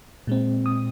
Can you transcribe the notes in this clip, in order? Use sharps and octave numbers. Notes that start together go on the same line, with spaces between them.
A#2 G#3 C4
D#6